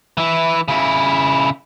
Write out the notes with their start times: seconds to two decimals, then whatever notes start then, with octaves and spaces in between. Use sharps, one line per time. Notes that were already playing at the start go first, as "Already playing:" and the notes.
0.17 E3 E4
0.68 C#3 E4